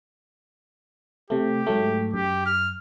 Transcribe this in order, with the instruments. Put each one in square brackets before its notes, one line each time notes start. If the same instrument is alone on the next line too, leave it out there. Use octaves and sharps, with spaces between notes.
[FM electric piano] C3 A3 [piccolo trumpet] G4
[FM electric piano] G#2 F#3 A3
[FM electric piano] F#2 [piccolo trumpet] G4
[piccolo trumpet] F6